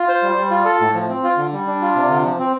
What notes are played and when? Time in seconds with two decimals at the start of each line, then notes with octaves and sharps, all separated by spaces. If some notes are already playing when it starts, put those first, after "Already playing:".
Already playing: F4
0.08 C5
0.23 G3
0.36 G3
0.51 F4
0.65 A4
0.81 A2
0.95 F3
1.09 C4
1.24 F4
1.37 D3
1.53 G3
1.67 D4
1.82 F4
1.96 C3
2.10 D3
2.25 F3
2.39 C4